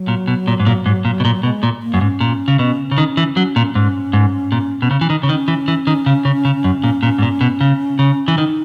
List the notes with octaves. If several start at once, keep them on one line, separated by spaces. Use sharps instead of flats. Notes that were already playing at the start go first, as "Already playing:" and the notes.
Already playing: F#3
A#2
B2
A#2
G#2
A#2
G#2
A#2
B2
A#2
B2 G#3
A#2
A#3
F#2
G#2 C#4
A#2
C#3
B2
C#3
D#3
E3
F#3
A#2
G#2 C#4
G#2
A#2
B2
C#3
E3
D#3
C#3
D#3 C#4
E3
E3
D#3
C#3
C#3
C#3
F#2
A#2
A#2
G#2
A#2
B2
C#3
C#3
E3
D#3 D#4